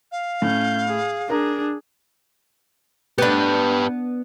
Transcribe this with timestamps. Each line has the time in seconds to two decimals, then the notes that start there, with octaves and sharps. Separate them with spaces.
0.12 F5
0.42 A2 C#4 G6
0.88 G#4
1.30 D4 G#4 A#4 A#5
3.18 B3 D4 G4 B4